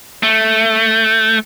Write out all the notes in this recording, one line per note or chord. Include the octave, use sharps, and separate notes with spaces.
A3